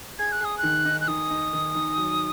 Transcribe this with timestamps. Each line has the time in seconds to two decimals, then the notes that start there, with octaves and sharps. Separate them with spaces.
0.19 G#4 G#6
0.32 F#6
0.41 G#4 D#6
0.58 F#6
0.63 D#3
0.85 D#4
1.01 F#6
1.08 D#3 D#6
1.30 D#4
1.53 D#3
1.75 D#3
1.98 F#3